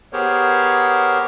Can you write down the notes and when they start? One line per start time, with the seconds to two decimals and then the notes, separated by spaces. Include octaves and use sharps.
0.13 B3 G4 G#4 A#4 C5 C#5